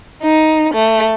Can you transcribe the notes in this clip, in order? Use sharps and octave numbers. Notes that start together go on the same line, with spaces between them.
D#4
A3